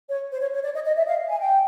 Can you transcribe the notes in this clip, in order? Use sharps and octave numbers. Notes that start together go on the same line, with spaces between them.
C#5
C5
C#5
C#5
D5
D#5
D#5
E5
F5
G#5
G5